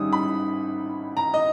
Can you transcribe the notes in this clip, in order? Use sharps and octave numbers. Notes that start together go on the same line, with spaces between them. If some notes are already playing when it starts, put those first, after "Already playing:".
Already playing: G#1 G#2 G3 C#4 E4 D#6 E6
B5
A#5
D#5